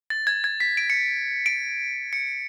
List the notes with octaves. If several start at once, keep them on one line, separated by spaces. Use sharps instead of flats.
A6
G#6
G#6
B6
D7
C#7
D7
C#7